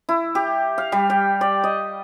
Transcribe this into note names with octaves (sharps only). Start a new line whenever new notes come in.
E4
G4
F5
G3
G5
D5
D#5